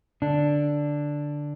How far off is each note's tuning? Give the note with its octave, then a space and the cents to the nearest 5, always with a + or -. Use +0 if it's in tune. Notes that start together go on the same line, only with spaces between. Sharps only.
D3 +0 D4 +0